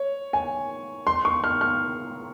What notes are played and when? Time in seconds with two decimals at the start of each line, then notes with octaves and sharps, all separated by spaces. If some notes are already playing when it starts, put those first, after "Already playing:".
Already playing: C#5
0.33 G#5
1.07 C6
1.25 C#6
1.44 F6
1.61 F6